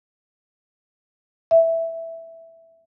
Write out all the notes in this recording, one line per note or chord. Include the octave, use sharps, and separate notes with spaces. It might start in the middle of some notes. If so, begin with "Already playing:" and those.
E5